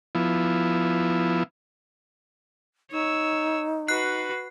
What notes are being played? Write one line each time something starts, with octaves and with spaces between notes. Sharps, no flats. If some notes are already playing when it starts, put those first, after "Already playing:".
F3 B3 E4
D#4 C#5 E6
F#4 B4 F#6 C7